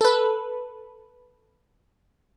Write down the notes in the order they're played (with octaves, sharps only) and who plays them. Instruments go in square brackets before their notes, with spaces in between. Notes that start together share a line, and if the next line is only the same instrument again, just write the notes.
[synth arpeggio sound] A4 B4